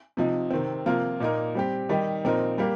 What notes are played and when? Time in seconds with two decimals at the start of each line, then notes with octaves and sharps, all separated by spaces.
0.17 C3 F3 D#4
0.50 C3 D#3 C4
0.86 C3 F3 A#3 F4 A#4
1.20 A#2 A#3 D#4 A#4
1.55 G3 C4 G4
1.89 D#3 G3 D#4 G4
2.24 A#2 F3 C4 D#4 A#4
2.58 G3 A#3 G4 A#4